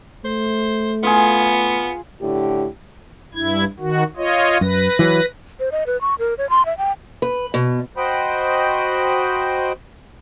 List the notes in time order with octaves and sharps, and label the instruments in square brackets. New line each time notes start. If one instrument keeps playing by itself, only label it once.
[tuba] A3 [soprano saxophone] C5
[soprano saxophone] B3 [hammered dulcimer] F4 G#4
[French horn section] A2 D3 G4
[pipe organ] G2 E4 G#6
D#3 F#4
F4 C#5 D#5
[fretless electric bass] F#2 [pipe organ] B4 A#6
[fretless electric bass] E3 F#3
[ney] C5
D#5
B4
C#6
A#4
C#5
C6
E5
G5
[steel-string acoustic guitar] B4
B2
[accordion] F#4 C5 D#5 G5 B5